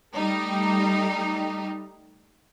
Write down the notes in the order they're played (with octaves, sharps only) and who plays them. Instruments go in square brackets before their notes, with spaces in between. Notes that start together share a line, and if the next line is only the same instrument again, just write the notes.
[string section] G3 A3 D#4 G4